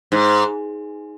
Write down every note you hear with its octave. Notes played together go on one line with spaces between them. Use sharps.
G#2